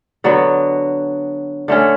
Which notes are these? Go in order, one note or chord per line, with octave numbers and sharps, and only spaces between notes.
D3 F#3 B3
D3 A3 C#4